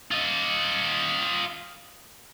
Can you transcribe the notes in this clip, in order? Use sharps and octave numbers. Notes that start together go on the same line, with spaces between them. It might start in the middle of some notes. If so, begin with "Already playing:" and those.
F4 D#5